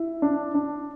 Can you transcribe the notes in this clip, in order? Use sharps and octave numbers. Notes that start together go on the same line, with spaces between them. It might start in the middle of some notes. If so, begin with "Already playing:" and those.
Already playing: E4
D4
D4